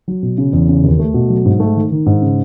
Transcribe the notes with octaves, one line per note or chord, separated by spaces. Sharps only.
F#3
B2
C#3
E2
C#3
D#2
A3
B2
F#3
G#2
A3
D#3
D#3
G#2
C#3